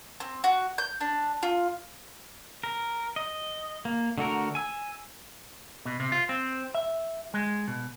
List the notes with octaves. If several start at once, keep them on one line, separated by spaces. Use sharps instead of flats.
C4
F#4
G6
D4
F4
A#4
D#5
A#3
D3 A3 F#4 A#4
G#5 E6
B2
C3
F4
C4
E5
G#3
B2